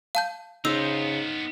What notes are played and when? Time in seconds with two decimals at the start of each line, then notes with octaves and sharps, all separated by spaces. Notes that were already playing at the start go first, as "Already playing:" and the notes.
0.15 F5 A5 G6
0.65 C#3 B3 D#4 F4 C5 E6